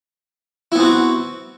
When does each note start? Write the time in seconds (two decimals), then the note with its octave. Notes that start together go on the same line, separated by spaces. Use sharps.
0.72 E4
0.75 B3
0.79 C4
0.82 F#4